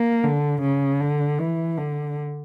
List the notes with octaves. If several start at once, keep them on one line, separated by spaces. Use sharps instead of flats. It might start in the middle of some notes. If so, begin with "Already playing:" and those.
Already playing: A#3
D3
C#3
D3
E3
D3